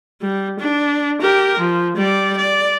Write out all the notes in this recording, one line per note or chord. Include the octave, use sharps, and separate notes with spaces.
G3
D4
G4 A#4
F3
G3 D5
D5